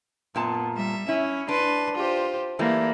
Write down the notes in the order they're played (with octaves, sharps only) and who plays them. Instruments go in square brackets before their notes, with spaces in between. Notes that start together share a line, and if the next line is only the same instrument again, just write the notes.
[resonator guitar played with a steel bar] F#2 A#2 A5 [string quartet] B3
[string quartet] G3 E5
[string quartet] C#4 [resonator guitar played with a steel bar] E4
[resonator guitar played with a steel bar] D4 [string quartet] B4 C6
[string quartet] F4 G4 C5
[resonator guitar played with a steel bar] E3 G3 A3 [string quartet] A#3 B5